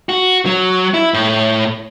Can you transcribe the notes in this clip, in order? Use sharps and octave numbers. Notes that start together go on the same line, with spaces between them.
F#4
F#3
E4
A2